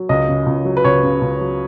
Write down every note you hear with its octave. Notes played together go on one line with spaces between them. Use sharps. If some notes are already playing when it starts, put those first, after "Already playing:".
Already playing: F#3
C#2 D#5
C#3
C#2
F#3
B4
C#2 C#5
C#3
C#2
F#3